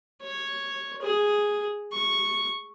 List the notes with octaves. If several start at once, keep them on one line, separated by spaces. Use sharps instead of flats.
C#5
G#4
C#6